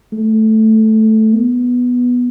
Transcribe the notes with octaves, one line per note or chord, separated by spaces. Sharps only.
A3
B3